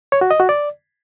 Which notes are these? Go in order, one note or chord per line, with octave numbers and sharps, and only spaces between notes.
C#5
F#4
D#5
F#4
D5